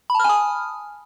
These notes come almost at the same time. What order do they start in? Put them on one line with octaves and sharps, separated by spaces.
B5 A5 F6 G#5 D#6